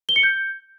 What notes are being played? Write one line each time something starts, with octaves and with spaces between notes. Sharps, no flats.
G7
C#7
G6